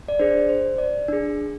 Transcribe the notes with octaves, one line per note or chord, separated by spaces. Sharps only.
D5
D4 G#4 C5
C5
D5
D4 G#4